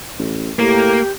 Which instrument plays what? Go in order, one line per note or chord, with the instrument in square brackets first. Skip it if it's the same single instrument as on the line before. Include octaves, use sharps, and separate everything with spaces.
[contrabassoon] A1
[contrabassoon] A2 [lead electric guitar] A#3 [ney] G4